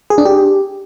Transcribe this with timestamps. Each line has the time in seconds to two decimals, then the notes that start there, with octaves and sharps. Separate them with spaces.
0.10 G#4
0.18 D4
0.26 G4